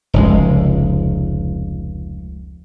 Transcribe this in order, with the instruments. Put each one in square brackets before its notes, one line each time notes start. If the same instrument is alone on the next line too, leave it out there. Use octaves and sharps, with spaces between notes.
[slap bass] F1 C#2 G#3